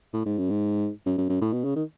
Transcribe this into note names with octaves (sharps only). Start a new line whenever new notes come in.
A2
G#2
F#2
G#2
F#2
F#2
F#2
A2
B2
C#3
D#3